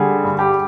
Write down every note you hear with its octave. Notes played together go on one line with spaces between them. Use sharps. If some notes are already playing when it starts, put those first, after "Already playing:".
Already playing: D3 G3 G#4
G2
G4